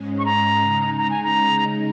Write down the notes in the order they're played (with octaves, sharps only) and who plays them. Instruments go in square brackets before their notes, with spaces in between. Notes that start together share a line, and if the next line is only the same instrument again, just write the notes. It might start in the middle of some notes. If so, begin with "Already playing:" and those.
Already playing: [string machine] G#2 G#3 C#4
[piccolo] C#6
A#5
[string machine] C#3 G#3 D#4
[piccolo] A#5
G#5
A#5